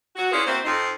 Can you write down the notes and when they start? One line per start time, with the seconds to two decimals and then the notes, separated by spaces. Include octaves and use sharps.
0.16 F#4
0.32 C#4 E4 F4 G#4 B4 D5
0.46 A#3 C4 E4 F#4 C5
0.65 F2 C4 D#4